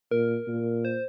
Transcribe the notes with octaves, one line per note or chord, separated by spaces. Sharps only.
A#2 A#4
A#2
C5